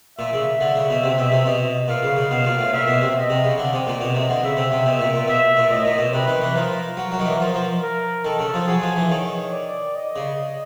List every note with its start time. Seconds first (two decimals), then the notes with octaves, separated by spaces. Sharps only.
0.19 A#2 E5
0.33 C#3
0.61 D3
0.76 C#3
0.90 B2
1.04 C3
1.18 B2
1.32 C3
1.46 B2 D#5
1.88 A#2 F5
2.02 C#3
2.17 C#3
2.31 B2 F5
2.44 A#2
2.59 A2
2.73 A#2 E5
2.88 B2
3.01 C3
3.16 D#5
3.30 C3
3.44 C#3
3.58 D3 D5
3.73 C3
3.87 A#2
4.01 B2 D#5
4.15 C3
4.29 D3
4.43 C#3 E5
4.57 C3
4.72 C3
4.86 B2 E5
4.99 A#2
5.13 A#2
5.28 B2 E5
5.57 A#2
5.70 A2 D#5
5.85 A#2
5.98 B2
6.13 C3 B4
6.28 D#3
6.42 E3
6.55 F3 A#4
6.97 F#3
7.12 F#3
7.19 D#3
7.25 E3
7.40 F3
7.54 F3
7.83 A#4
8.25 D#3 A4
8.39 C#3
8.54 F3
8.68 F#3 G#4
8.81 F3
8.96 E3
9.10 D#3 C#5
9.52 D5
9.95 D#5
10.16 C#3